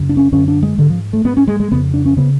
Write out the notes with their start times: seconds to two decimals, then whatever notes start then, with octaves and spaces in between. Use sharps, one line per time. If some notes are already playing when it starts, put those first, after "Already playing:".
Already playing: F#2 C#3
0.09 D4
0.17 C#4
0.32 F#2 D3 C#4
0.48 D4
0.62 G#3
0.78 G#2 D3
0.90 F3
1.13 A3
1.24 G#2 B3
1.37 C#4
1.47 G#3
1.60 G#3
1.71 F2 C#3 B3
1.94 D4
2.05 C#4
2.17 C#3 B3